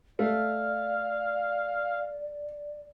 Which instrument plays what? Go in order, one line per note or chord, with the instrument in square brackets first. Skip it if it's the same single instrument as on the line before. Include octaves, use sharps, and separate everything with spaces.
[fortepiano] A3 [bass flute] D5 [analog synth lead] F5